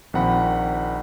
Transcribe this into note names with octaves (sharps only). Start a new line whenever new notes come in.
A#1 D#3 F3 C4 F#5 B5